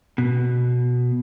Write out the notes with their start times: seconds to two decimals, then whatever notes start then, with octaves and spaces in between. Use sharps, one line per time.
0.18 B2